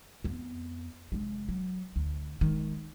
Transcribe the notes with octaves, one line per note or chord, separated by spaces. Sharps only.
F2 B3
F1 G#3
F#3
D2
D#3 G#3